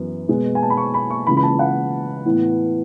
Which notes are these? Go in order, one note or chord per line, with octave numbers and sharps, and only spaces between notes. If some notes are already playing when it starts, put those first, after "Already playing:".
Already playing: F#2 E3 B3
B2 G#3 B3
G#5
A5
B5
C#6
B5
C#6
C#2 C#3 E3 B5
B5
A5
F#5
A2 E3 B3